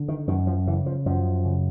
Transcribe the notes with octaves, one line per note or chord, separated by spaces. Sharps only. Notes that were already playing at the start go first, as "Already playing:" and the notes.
Already playing: D3
D#3
F#2 D#3
F3
C#3 E3
F3
F#2 F3
C#3